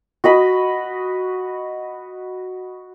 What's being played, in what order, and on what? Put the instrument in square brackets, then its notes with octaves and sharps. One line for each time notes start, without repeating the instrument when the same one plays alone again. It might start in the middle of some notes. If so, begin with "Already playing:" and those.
[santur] F#4 D#5 B5